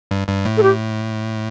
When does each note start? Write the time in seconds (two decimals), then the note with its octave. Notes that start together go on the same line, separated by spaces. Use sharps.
0.11 G2
0.28 G2
0.45 A2
0.57 A4
0.63 G4